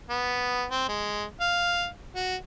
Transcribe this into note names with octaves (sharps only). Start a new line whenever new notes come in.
B3
C4
G#3
F5
F#4